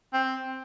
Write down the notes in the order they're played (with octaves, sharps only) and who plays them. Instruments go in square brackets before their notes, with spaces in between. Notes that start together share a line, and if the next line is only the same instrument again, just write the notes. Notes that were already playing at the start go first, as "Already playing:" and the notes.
[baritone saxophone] C4